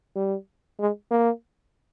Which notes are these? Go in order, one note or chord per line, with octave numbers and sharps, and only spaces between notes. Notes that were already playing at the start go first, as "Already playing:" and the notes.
G3
G#3
A#3